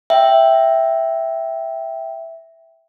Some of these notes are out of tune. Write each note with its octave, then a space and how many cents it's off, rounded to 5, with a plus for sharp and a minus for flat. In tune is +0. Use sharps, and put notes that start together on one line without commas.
E5 +0 G5 +0